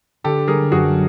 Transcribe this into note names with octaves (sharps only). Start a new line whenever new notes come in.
D3 G4 A4
G3 G#4 A#4
F#2 F#4 G#4